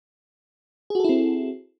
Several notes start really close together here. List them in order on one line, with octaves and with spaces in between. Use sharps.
G#4 F#4 A4 E4 C4